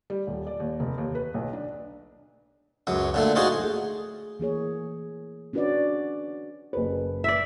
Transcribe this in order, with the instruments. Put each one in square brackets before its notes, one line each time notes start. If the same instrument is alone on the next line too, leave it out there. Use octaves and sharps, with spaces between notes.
[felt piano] G3
D#1
D5
D#2
F1
D#2
B4
B1
D4
[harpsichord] C#2 F#2 F#3
A#2 D3 A3
D#4 F4 F#4 G#4 C5
[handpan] A3 G#4
E3 A#3 G#4 C#5
C#4 D4 F#4 B4 C#5 D5
[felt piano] F#1 B4
[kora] D5 E5